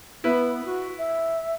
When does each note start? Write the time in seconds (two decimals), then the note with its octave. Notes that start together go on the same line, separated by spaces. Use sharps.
0.24 B3 E4 B4
0.65 F#4
0.98 E5